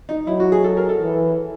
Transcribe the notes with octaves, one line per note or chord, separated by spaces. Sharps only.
D#4
F#3 E4
F#4
G#4
A4
A#4
A4
E3